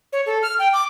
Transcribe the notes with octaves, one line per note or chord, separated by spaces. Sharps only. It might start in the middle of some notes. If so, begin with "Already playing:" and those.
C#5
A4
F6
G5
D6